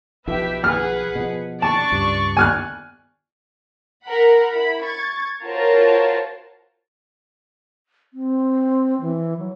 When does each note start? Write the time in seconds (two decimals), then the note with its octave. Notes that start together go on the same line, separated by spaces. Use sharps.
0.27 B1 B2 F3 G4 B4 E5
0.64 G#4 B4 F#5 F6
1.15 B2 F3
1.62 D4 D5 A5 C#6
1.92 C#2 G2
2.37 G#5 F6 F#6
4.04 A#4 F#5 B5
4.52 E4 B5
4.81 C#6 G#6 A6
5.45 F4 F#4 A#4 C5 C#5 A5
8.14 C4
9.01 E3
9.39 F#3